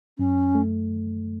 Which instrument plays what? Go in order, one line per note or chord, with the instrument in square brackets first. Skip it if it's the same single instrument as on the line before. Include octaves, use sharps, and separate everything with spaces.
[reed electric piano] F#2 [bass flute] C#4
[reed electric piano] A3